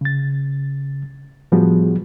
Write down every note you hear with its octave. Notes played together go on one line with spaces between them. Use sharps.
C#3 A6
A2 F3 G3 B3 F#4 G#4